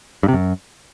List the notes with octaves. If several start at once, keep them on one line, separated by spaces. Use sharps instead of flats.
G2
C3
F#2